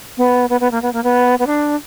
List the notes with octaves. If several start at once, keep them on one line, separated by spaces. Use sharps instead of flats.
B3
B3
B3
A#3
B3
A#3
B3
B3
D4